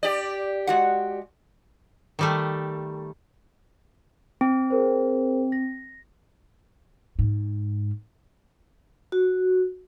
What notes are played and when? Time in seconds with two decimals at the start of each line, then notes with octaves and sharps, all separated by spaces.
0.03 G4 D5
0.67 G#3 F#4 F#5
2.19 D#3 G3 A3
4.41 C4
4.70 G#4 A#4 C5
5.52 A#6
7.19 G#2
9.12 F#4